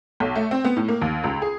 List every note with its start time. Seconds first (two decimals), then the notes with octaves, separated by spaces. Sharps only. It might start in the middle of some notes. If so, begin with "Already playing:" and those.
0.20 B1
0.35 A3
0.51 C4
0.65 B3
0.77 A2
0.88 A#3
1.02 D#2
1.24 C#2
1.42 G#4